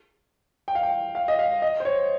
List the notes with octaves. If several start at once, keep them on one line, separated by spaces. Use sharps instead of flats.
G5
F5
G5
F5
D#5
F5
D#5
C5
C#5